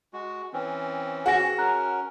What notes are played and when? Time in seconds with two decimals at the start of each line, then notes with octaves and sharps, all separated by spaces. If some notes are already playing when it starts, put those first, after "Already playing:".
0.13 G#3 F#4
0.53 E3 C4 C#4
1.26 F#4 G#4 G#5 A#6
1.58 C#4 A#4 A#5 F#6